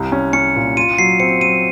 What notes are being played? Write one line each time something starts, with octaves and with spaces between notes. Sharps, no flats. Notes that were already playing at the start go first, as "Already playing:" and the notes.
Already playing: C2
C#4
C#4 C#7
A#2
F4 D#7
F#3 C7
C4 C#7
F#3 D#7